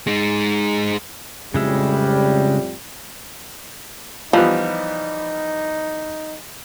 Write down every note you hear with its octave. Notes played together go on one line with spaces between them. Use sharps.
G#3 D#4
F2 A2 C#3 G3 G#3 E5
E3 F3 G3 B3 D#4